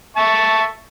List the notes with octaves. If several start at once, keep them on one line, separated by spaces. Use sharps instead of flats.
E5 A5 C#6